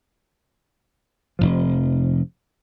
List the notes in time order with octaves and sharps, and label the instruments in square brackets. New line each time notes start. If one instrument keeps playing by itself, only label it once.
[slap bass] F1 C#2 F3